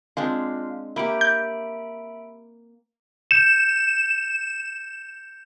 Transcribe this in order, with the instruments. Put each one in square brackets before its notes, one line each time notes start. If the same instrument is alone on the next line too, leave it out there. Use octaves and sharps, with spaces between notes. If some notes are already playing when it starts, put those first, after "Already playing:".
[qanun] G#3 C4 D4 [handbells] F4 F5
[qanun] A#3 G4 [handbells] E5 B5 D7
[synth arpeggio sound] G6
[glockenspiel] G6 C#7 [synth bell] E7